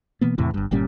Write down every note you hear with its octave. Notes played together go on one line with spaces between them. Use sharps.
B2 E3 A#3 B3
E2 A2 C3 E3
G1 G2
G1 A#2 G3 C#4